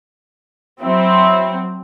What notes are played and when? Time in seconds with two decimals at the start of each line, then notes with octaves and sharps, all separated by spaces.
0.82 F#3 C4 E4 C5 E5